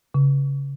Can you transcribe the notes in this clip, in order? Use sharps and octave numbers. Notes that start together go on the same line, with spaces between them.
C#3